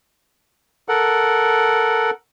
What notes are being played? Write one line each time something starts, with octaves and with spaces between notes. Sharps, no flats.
A4 A#4 F#5